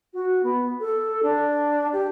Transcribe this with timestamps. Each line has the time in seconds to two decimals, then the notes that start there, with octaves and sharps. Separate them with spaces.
0.14 F#4
0.43 B3
0.80 A4
1.23 D4
1.93 G4